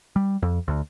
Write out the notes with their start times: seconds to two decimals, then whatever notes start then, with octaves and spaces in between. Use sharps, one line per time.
0.16 G3
0.43 F2
0.68 D2